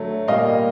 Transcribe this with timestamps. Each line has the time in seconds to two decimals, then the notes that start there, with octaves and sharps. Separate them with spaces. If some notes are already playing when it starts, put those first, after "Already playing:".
Already playing: D3 F#3 A3
0.28 A#2 G3 A#3 D#5 F5